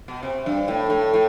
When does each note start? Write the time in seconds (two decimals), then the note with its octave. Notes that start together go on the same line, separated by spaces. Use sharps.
0.08 B2
0.23 C3
0.46 G2
0.68 A2
0.90 A2
1.13 A2